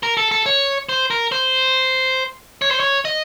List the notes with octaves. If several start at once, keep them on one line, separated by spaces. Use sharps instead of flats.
A#4
A4
A4
C#5
C5
A#4
C5
C#5
C5
C#5
D#5